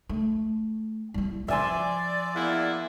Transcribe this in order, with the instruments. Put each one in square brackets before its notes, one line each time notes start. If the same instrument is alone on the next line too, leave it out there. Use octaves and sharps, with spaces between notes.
[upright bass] A3
G3 E4
[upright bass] F3 [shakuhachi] D5 [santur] E5 G#5 C6
[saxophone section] E2 A#3 E4